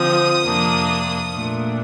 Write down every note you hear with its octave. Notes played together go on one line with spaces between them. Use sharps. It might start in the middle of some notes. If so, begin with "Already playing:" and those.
Already playing: D3 F3 C4 D#6
F2 C3 F3 A#3 D4
A#2 A3 D4